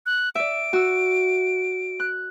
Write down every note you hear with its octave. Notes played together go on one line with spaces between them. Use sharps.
F#6
D5 E5 D7
F#4 E6
F#6